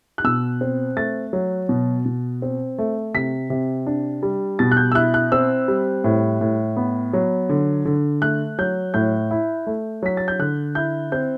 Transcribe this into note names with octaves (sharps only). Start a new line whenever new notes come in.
F#6
B2 E6
C4
A3 A6
F#3
B2
B2
C4
A3
C3 B6
C3
D4
G3
B2 A6
F#6
G6
E6
E4 F#6
F#6
C4 E6
G3
A2
A2
B3
F#3
D3
D3
A3 F#6
F#3 G6
A2 G6
E4
A3
F#3 B6
A6
G6
D3 F#6
E4 G6
C4 G6